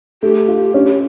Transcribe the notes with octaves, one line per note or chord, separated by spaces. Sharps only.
A3 G4
F4
C#4